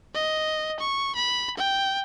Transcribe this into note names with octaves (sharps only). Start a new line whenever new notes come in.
D#5
C#6
B5
G5